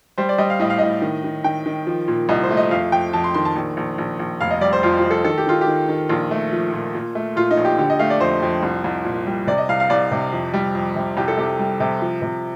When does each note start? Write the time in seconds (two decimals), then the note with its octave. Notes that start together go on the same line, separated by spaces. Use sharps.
0.18 G3 C5
0.29 D5
0.38 G3 D#5
0.50 F5
0.59 A2 D#5
0.70 F5
0.79 A2 D#5
1.02 D#3
1.24 D#3
1.44 D#3 G5
1.66 D#3
1.87 F3
2.08 A#2
2.29 C2 D#5
2.43 C5
2.51 A3
2.57 D#5
2.71 F2 F5
2.92 F2 G5
3.13 F2 A5
3.24 C6
3.34 D#3 C6
3.45 A5
3.56 A#1
3.77 A#1
3.98 A#1
4.19 A#1
4.41 F1 F5
4.51 D#5
4.61 G3 D5
4.73 C5
4.83 F2 F4
4.97 F4
5.03 F2
5.11 A4
5.25 D#3 A4
5.38 G4
5.47 D#3 F4
5.61 G4
5.67 D#3
5.89 D#3
6.09 A#1 F4
6.31 A3
6.52 F3
6.73 A#2
6.95 A#2
7.15 A3
7.36 A#2 F4
7.51 D#4
7.57 A#1
7.65 G4
7.78 D3 G4
7.90 D#5
7.99 A3 F5
8.10 D5
8.21 F2 C5
8.43 F2
8.63 C2
8.84 C2
9.05 A#2
9.27 G3
9.47 C3 D5
9.58 D#5
9.69 C2 F5
9.80 F5
9.90 C2 D5
10.12 C3
10.32 F2
10.54 G3
10.75 F2
10.96 C3
11.17 C2 G4
11.28 A4
11.38 C3 G4
11.59 G3
11.80 C3
12.02 F3
12.22 C3